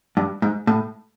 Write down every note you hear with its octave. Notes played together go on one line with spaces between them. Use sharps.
G2
G#2
A2